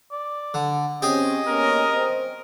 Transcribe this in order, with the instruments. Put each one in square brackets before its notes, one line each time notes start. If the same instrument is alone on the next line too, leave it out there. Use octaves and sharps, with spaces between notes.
[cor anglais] D5
[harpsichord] D3
[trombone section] C4 C#4 [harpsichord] G4 G#4 [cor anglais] D#5
[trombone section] A#3 B3 C#4 [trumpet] A#4
[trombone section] C4